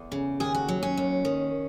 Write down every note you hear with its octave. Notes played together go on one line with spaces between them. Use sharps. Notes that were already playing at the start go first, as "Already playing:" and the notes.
Already playing: E2
C#3
D#2 G#4
F#4
F#3
C#4
D#2
D#3